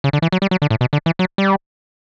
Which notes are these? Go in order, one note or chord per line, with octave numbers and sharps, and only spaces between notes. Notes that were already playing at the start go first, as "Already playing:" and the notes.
C#3
D3
E3
F#3
G3
F#3
D3
A2
B2
D3
E3
F#3
G3